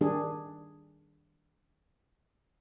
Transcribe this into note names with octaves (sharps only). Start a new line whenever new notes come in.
D#3 G3 D4 G#4